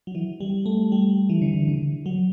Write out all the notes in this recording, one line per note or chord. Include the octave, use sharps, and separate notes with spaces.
F#3
E3
G3
A3
G3
E3
D3
E3
D3
F#3